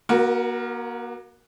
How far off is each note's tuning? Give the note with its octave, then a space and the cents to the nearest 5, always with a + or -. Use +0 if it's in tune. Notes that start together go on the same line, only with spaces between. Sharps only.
A#3 +40 F#4 +0 A#4 +0